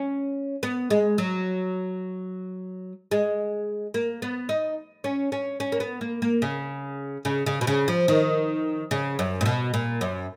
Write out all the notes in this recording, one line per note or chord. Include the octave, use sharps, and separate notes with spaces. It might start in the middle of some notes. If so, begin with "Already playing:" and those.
Already playing: C#4
B3
G#3
F#3
G#3
A#3
B3
D#4
C#4
C#4
C#4
A#3
B3
A#3
A#3
C#3
C#3
C#3
B2
C#3
F3
D#3
C#3
F#2
A#2
B2
A#2
F#2